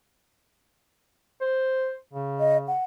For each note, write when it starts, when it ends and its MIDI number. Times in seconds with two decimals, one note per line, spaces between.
1.41 1.93 72
2.13 2.73 49
2.40 2.57 75
2.68 2.84 78